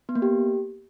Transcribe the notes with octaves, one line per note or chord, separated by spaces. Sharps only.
B3
A#3
G4